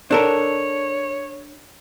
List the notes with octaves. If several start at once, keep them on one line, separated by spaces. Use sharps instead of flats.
D4 A4 A#4 C#5